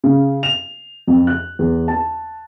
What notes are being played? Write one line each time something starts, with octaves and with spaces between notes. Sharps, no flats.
C#3
F7
F2
F#6
E2
A5